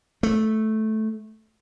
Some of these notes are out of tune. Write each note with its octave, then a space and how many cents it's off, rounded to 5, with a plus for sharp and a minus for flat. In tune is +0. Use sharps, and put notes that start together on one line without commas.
A3 -10